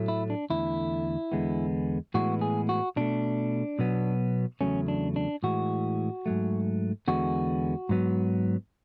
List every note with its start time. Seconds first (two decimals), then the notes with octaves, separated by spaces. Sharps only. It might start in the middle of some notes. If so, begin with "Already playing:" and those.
Already playing: A2 F#3 A3
0.08 E4
0.30 D4
0.50 E2 D3 A3 E4
1.32 E2 D3 G#3 B3
2.14 A2 E3 G#3 B3 F#4
2.41 G#4
2.69 F#4
2.96 B2 A3 D4
3.79 B2 F#3 B3
4.61 E2 C#3 F#3 A3 C#4
4.88 D4
5.16 D4
5.43 A2 E3 G#3 F#4
6.26 G#2 F#3 A3
7.08 E2 D3 G#3 B3 F#4
7.89 G#2 F#3 B3